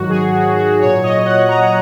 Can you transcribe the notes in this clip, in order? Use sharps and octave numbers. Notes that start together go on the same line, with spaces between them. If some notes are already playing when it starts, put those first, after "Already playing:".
Already playing: G#2 D#3 F#3 F#4
G#4
F#4
F#4
A#2 F#3 C#5
D#5
F#5
A#5